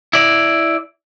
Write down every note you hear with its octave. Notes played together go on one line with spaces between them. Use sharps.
E4 D5